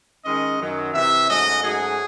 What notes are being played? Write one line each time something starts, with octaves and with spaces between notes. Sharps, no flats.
D#3 G#3 C#4 D#5
F#2 D#3 F#3
C3 E3 C4 E5
G#2 F#3 A3 C#4 D#5
G#2 F#3 A3 C#4 G#4